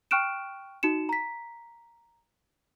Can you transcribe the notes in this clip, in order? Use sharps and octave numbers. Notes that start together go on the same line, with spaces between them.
G5 C#6 F6 F#6 D7 E7
D#4 F#4 C#7 E7
A#5 B6